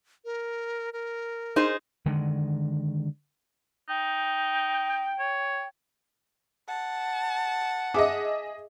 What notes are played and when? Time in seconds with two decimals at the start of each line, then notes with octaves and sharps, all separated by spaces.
0.25 A#4
0.93 A#4
1.56 D#4 G#4 C5
2.06 D3 D#3 G#3
3.89 D#4 G5
5.19 C#5
6.68 F#5 A5
7.94 G#4 D#5 E5 D6